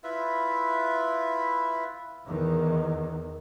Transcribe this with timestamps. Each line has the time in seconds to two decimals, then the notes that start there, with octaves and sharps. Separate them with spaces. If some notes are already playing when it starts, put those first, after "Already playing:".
0.04 E4 F4 B4 E5
2.25 E2 D#3